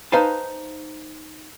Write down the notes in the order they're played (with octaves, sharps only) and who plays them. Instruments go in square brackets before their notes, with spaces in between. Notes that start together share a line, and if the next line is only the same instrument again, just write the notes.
[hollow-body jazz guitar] D#4 B4 C5 F5 G#5 A5